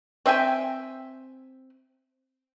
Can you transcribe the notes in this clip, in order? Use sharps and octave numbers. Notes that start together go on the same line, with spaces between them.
C4 E5 G5 G#5